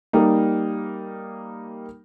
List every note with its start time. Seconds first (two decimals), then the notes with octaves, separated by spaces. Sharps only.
0.13 G3 A#3 D#4